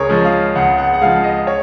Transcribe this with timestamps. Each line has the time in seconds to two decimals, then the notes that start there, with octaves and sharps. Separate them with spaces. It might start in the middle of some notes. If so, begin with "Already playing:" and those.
Already playing: C#2 G#4 A#4 C#5
0.09 C#3 F3 G#3
0.25 F5
0.55 C#2 F#5
0.78 F#5
0.93 F#5
1.01 C#3 F3 G#3 F5
1.24 D#5
1.47 C#5